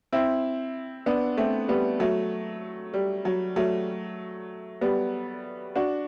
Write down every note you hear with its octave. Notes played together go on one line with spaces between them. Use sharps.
C4 E4
B3 D4
A3 C4
G3 B3
F#3 A3
G3
F#3
F#3 A3
G3 B3
D4 F#4